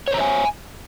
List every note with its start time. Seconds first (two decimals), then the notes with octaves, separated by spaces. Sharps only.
0.08 C#5
0.11 C5
0.14 A#5
0.17 E5
0.21 G#5